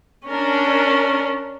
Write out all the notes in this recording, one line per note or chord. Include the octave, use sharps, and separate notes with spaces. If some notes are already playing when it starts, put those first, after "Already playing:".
C#4 D4 A#4